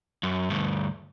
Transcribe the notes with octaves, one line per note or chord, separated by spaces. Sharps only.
F#2
D2 G2